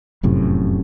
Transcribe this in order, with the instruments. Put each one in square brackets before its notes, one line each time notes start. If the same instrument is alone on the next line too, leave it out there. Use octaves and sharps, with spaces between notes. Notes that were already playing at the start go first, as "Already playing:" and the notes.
[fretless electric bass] F1 F#2 A2 C3